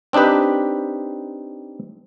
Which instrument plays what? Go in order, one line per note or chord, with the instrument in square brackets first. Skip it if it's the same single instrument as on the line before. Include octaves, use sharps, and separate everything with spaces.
[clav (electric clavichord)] C4 D4 D#4 G4 B4